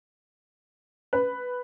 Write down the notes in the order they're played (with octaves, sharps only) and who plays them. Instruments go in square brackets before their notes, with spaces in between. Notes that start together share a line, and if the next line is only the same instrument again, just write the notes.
[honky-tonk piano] B4